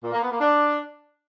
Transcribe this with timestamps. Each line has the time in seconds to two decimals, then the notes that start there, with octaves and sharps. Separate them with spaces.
0.04 A#2
0.13 A#3
0.22 B3
0.31 A#3
0.39 D4